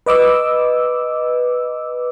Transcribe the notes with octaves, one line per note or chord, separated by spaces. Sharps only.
B4 D#5 D6 E6